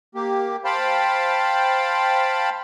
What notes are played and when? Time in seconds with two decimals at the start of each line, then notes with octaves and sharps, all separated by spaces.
0.15 A#3 G4
0.65 C5 F5 G5 A5 B5